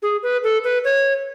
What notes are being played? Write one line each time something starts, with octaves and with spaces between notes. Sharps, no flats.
G#4
B4
A4
B4
C#5